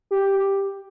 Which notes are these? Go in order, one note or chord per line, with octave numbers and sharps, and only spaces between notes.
G4